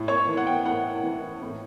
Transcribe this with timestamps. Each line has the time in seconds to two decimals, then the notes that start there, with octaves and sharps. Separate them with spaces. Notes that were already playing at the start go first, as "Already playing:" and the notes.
Already playing: A2
0.08 C#5 C#6
0.27 E3
0.37 F#5
0.47 G5
0.65 A2 F#5
1.03 E3
1.42 A2